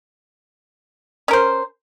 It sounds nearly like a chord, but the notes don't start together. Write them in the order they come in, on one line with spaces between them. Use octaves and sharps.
C#4 A#4 C5